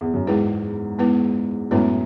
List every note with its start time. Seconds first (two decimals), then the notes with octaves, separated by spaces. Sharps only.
0.01 E2
0.14 F#2
0.27 E2 G#2 G#3 B3 E4 B4
0.99 G#3 B3 E4 B4
1.71 F#2 A2 G#3 B3 E4 B4